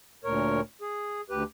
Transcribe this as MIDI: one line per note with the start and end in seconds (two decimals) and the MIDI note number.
0.24 0.61 38
0.24 0.61 46
0.24 0.61 70
0.24 0.61 73
0.81 1.21 68
1.30 1.43 38
1.30 1.43 67
1.30 1.43 71